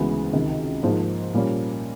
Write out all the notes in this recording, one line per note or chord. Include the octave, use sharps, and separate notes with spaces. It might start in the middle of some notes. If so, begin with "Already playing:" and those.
Already playing: D2 C#3 E3 G#3 B3
C#2 C3 D#3
G#2 F3 A#3 D#4
A#2 G3 A#3 C#4